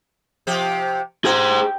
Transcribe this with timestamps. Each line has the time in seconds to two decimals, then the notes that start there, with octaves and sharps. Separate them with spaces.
0.47 C3 F3 G4
1.25 G4 G#4 C5